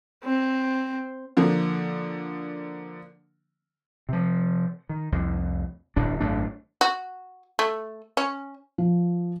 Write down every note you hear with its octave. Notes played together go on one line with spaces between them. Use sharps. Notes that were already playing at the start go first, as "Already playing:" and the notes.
C4
D3 F3 A#3
C3 F3
D#3
C2 F2
D1 G1 D4
G#1 F#2 A3 D4
F#4
A3
C#4
F3